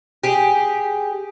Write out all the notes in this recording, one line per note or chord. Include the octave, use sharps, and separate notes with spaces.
G4 G#4